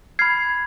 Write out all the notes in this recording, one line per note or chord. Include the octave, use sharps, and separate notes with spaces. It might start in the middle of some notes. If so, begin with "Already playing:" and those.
B5 F6 G#6 C7